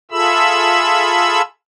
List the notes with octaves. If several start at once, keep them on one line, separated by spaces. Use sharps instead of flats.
F4 G#4 A4 E5 B5 E6